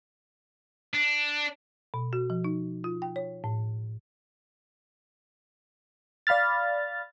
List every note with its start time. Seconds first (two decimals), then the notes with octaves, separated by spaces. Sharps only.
0.93 D4
1.94 B2
2.13 F#4
2.30 F3
2.44 D#4
2.84 F4
3.02 G5
3.16 C#5
3.44 A2
6.27 D5 F5 B5 F6 A6